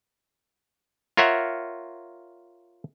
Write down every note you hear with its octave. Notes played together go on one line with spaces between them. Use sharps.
F4 A#4 C#5 E5 F#5